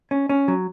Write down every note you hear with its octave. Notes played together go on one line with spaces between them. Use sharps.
C#4
C#4
F#3